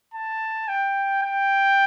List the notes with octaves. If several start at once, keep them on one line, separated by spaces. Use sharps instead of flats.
A5
G5
G5